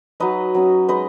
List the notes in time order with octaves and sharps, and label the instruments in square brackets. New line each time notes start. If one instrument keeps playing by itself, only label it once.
[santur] F#3 D#4 B4 D#5
F#3 C#4
G#3 D#4 B4 D#5